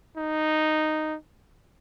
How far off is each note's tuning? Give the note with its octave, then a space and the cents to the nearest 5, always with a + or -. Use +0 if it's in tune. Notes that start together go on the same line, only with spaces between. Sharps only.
D#4 -5